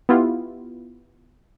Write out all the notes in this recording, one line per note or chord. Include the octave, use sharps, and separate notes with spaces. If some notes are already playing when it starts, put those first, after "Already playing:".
B3 E4 F4 G4